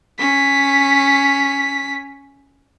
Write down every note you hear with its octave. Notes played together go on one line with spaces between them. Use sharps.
C#4 B6